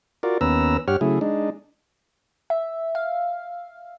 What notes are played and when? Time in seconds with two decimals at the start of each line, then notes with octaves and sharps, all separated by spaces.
0.23 F4 F#4 A#4 D5
0.41 D#2 B3 C#4 B4 A#5 E6
0.88 G2 G4 C#5 F#5 F6
1.01 C#3 F#3 A3 E4 G#4
1.21 G#3 D4 D#4
2.50 E5
2.95 F5